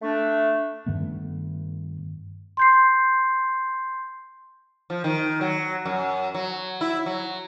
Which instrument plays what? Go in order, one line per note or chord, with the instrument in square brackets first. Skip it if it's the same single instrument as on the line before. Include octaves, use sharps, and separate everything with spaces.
[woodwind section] A3 D4
[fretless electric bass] G2 D#3 A3 B3
[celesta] C6 G6 C7
[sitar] F3
D#3
F#3
F#2
F#3
E4
F#3